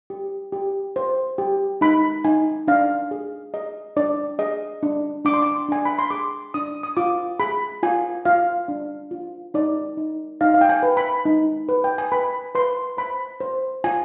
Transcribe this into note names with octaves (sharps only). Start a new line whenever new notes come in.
G4
G4
C5
G4
D#4 B5
D#4 G#5
D4 F5
G#4
G#4 D#5
D4 D5
G#4 D#5
D4
D4 D6
C6
D6
D4 G#5
B5
C6
G#4 D6
D4 D#6
D#6
F4 D6
G#4 B5
F4 G#5
F4 F5
D4
F4
D#4 D5
D#4
D#4 F5
F5
G5
G#5
B4
B5
D#4
B4
G5
G#5
B4 B5
B4 C6
C5 B5
C5
F4 G#5